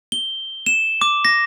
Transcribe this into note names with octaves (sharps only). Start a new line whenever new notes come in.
G7
E7
D6
A#6